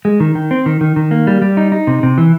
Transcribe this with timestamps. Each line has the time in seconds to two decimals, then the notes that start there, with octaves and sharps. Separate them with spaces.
0.05 G#3
0.20 D#3
0.35 D#3
0.51 C4
0.66 D#3
0.81 D#3
0.96 D#3
1.11 A#3
1.27 G3
1.42 G3
1.57 D#4
1.72 D#4
1.87 C3
2.03 C3
2.18 E3